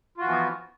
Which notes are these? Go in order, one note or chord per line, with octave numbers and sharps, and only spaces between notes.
E3 F3 B3 F4 F#4